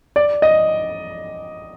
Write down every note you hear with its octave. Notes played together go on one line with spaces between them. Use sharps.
D5
D#5